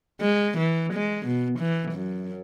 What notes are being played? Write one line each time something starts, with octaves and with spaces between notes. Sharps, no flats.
G#3
E3
G#3
B2
E3
F#2